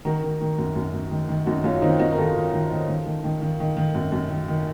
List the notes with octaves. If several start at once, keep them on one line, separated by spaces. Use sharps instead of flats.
D#3 F#4 A#4
D#3
D#3
F#2
F#2
F#2
D#3
D#3
F#2 D#4 F#4
F#2 C#4 F4
D#3 C4 D#4
F#2 D#4 F#4
A#4
D#3 F4 A4
D#3
D#3
D#3
D#3
D#3
D#3
D#3
D#3
D#3
F#2
F#2
D#3
D#3